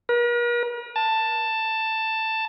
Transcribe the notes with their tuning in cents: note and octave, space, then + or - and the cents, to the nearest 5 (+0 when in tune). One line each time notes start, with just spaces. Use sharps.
A#4 +45
A5 +10